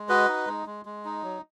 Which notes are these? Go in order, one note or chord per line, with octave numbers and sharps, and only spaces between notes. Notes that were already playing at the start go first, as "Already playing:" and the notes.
Already playing: G#3
F#4 B4 D#5
D#4
G#3
G#3
G#3
D#4
F#3